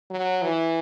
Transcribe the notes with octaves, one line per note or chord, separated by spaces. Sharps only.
F#3
E3